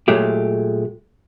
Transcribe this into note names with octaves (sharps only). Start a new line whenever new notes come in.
A#2 F#3 G#3 A3 G4